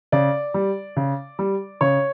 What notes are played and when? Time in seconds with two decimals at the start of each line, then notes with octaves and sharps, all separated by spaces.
0.12 C#3 D5
0.54 G3
0.97 C#3
1.39 G3
1.81 C#3 C#5